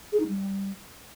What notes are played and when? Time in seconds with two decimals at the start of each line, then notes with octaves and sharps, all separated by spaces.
0.12 G#4
0.20 D#4
0.28 G3